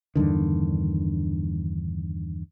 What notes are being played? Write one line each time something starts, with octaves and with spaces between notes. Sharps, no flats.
E2 G2 D3 D#3